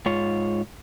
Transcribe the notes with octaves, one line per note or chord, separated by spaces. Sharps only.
G#2 F4 C#5